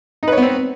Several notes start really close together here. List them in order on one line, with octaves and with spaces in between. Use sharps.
D#4 B4 C#5 B3 C4